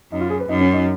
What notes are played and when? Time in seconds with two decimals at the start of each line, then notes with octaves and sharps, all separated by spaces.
0.12 F#2 D#4
0.21 F4
0.30 G#4
0.40 B4
0.49 F#2 D#4
0.61 C#4
0.73 D#4